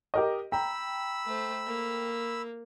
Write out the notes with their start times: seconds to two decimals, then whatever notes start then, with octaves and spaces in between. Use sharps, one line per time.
0.14 G4 A#4 D#5
0.52 G5 A#5 B5 E6
1.26 A3 C5
1.66 A#3